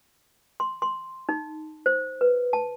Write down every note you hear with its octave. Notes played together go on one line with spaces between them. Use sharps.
C6
C6
D#4
C5
B4
A5